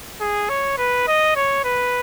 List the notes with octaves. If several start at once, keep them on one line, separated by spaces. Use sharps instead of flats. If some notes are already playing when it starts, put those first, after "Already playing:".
G#4
C#5
B4
D#5
C#5
B4